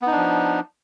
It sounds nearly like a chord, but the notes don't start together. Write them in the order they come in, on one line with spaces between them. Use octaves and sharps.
B3 D#4 D4 F3